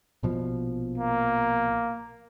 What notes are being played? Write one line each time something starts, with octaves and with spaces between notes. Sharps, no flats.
A#1 B2 F3
A#3